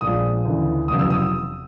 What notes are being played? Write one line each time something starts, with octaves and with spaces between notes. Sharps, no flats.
A#1 A#2 F3 G#3 D#6
D2 C#3 E3
F1 E2 C#3 F#3 D#6
E6
D#6